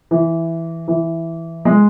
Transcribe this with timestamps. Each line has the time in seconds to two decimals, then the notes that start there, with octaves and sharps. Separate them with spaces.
0.11 E3
0.88 E3
1.65 G#3